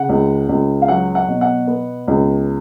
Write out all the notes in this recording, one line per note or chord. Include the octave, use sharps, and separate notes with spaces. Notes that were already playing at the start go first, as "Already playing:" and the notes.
Already playing: C#3 F#5
C#2
C#2
F5
F#3 F#5
F#5
B2
F#5
B3
C#2